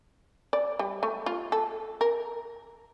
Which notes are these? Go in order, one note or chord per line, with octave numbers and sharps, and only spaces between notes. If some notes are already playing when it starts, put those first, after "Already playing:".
D5
G3
A3
F4
A4
A#4